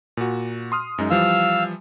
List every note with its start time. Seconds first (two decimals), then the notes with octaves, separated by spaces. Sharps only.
0.17 A#2 F#4
0.72 C6 D#6 F6
0.98 F#2 G#3 D#4
1.10 E3 F3 G3 F5 E6